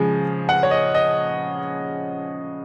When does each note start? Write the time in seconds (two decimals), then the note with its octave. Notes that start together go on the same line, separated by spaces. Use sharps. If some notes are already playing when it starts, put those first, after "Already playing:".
Already playing: C#3 F3 G#3
0.49 F#5
0.63 C#5
0.71 D#5
0.95 D#5